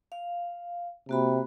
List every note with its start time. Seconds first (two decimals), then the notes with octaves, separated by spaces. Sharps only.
0.12 F5
1.09 C3 A#3 F#4 B5